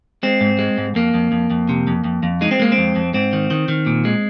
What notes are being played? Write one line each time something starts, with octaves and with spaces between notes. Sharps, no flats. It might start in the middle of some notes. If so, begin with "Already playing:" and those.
G#3 C4
G#2
G#3
G#2
F2 A#3
F2
F2
F2
C3
F2
F2
F2
G#3 D#4
C4
G#3 A#3
C4
F2
F2
G#2 C4
D#3
D#3
D#3
A#2
G#3